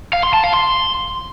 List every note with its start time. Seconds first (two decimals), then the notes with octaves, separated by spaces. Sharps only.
0.13 F5
0.23 C6
0.33 A5
0.44 F5
0.54 C6